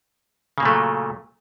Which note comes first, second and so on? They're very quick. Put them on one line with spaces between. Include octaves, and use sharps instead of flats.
C#3 A#3 A#2 A3 F#3